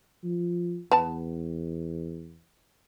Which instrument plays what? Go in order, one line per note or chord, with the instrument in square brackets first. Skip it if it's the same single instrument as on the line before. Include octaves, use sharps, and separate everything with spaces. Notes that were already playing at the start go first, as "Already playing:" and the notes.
[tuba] F3
[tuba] E2 [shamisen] B3 A5